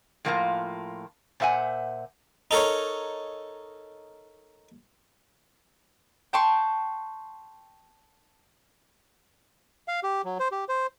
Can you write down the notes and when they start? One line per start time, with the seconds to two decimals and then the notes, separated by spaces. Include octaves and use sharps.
0.25 A2 F3 A#3 F4 E5 A#5
1.40 A#2 C5 E5 F#5 G#5
2.51 D#4 A4 A#4 C#5
6.33 G5 A5 C6 C#6
9.88 F5
10.03 G4
10.25 F#3
10.40 C5
10.52 G4
10.69 C5